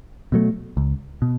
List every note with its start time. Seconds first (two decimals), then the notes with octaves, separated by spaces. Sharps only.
0.32 B2 F#3 A3
0.77 C#2
1.22 B2